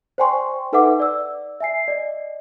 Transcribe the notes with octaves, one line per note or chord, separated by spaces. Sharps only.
C5 D5 G5 G#5 C6 C#6
D#4 A4 B4 E5 F#5 D6
D5 E6
E5 G#5 C7
D5 D#5